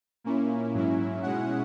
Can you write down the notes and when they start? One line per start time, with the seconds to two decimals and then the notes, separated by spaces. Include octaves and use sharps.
0.24 A#2 A#3 C#4 E4
0.74 G#2 F#3 C#4 E4
1.23 B2 G#3 C#4 E4 F#5